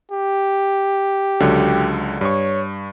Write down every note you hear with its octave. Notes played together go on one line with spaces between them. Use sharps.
G4
C#2 D3 F#3
G2 C#5 C#6